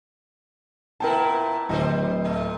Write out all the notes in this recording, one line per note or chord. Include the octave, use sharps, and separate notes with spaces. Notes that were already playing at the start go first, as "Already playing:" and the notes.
A#2 B3 E4 A#4 G5 A5
D1 D3 G4 C5 D#5
A#2 A3